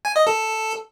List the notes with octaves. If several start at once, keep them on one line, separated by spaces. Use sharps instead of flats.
G#5
D#5
A4